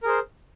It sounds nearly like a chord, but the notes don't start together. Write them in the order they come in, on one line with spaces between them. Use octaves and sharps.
A#4 G#4 C5